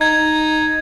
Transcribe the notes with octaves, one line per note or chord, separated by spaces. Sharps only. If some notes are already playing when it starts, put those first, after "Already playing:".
D#4 G#6